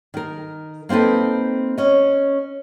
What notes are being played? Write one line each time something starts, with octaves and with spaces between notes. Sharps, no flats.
D#3 A#4
A#3 C4 D#4 A4 B4
C#4 D#5